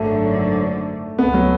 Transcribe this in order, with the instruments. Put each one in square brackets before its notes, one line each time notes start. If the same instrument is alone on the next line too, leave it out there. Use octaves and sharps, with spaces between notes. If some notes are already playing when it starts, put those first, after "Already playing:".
Already playing: [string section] G#1 F#2 D3 [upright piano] A3
[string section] C#2 B2 A3 [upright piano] B3
[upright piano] F#3